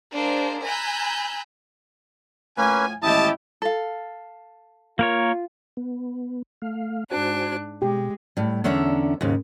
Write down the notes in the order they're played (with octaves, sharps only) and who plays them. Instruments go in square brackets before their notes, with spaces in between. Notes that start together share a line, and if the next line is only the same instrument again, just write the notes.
[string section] G#3 A#3 D4 C5
G#5 A#5 B5 E6 F#6 G6
[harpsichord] A2 F3 [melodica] A#3 C#4 B4 [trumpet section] G#5
[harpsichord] A1 D#2 G#3 [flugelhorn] E4 [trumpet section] G4 A5 [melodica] D#6
[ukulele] A4 F5
[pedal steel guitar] A#3 A#4 C#5 [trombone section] F4
[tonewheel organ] B3
A3 F5
[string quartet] G#2 D4 F#6 [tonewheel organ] F#4 C5 G#5
[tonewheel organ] B2 [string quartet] G#3 [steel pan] G4
[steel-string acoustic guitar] A2 G3
E2 D3 C#4 D4 E5 A#5
D#2 G#2 C#3